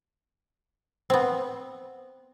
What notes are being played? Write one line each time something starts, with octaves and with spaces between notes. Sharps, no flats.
B3 C4